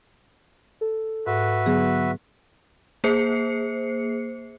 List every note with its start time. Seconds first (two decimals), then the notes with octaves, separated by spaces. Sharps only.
0.81 A4
1.26 G#2 F#4 B4 E5
1.66 D3 F#3 B3 G#4
3.04 A#3 G#4 C5 C7 C#7